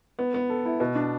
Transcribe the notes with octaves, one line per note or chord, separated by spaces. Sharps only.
B3
B3
A4
E4
B2
D4